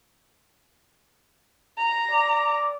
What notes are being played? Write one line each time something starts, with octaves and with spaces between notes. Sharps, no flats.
A#5
D5